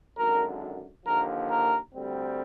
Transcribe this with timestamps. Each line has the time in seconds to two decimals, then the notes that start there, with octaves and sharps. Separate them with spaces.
0.18 G#1 F#2 D3 A#4
1.06 D#2 D3 F3 A#3 A#4
1.50 A#4
1.93 D2 D3 G3 C4